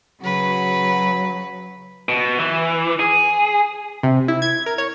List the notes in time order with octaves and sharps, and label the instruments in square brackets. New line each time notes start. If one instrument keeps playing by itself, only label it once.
[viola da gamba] C#3 F#4 B4 [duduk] F#3
[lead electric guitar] B2
E3
G#4
[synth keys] C3
E4
G#6
A#4
C#5